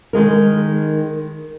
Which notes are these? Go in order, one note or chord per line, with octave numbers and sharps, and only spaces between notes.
D#3 G#3 A#4